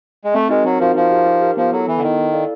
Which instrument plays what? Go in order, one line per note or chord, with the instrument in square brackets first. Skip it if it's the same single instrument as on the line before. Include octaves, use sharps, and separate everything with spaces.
[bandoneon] G#3
[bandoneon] A3 [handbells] C4
[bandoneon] G#3 [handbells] D#4 F#4 A#4
[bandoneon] F#3 [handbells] C4
[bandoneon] F3 [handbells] D#4 F#4 A#4
[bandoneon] F3 [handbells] D#4
[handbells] G4 A#4
D#4
G4 A#4
[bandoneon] F3 [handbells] B3
[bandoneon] F#3 [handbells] E4 A4
[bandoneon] E3 [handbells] B3
[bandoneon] D3
[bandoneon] D#3 [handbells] E4 A4
[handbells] E4
A4 D5 F5